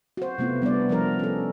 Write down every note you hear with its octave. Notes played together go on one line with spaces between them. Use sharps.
F#4 C5
C3 A3 B3 E4 F4
G3 B3 D4 D5
F3 G3 D4 A#4
C#4 A4